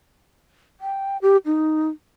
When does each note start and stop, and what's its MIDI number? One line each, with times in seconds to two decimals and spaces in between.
0.81 1.17 79
1.22 1.37 67
1.46 1.88 63